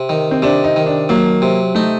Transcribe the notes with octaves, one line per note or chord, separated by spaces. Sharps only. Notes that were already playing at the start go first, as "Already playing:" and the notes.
Already playing: C3
D#3
C4
C3 D4
D#4
D#3
D4
F#3 A#3
C3
A3 D#4